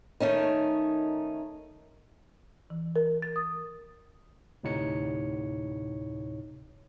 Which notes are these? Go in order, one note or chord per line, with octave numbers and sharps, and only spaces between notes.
D#3 A3 C#4 D#4
E3
A#4
A6
D#6
D2 A2 C3 D#4 C#5 C#7